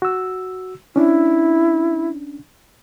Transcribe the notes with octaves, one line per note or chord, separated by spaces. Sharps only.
F#4 E6
C#4 D4 E4